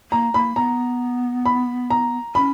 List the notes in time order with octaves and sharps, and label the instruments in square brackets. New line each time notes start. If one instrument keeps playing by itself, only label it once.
[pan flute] A#3 [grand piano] A#5
[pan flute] A#3 [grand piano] B5
[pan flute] B3 [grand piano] A#5
[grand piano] B5
A#5
[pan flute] C#4 [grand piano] B5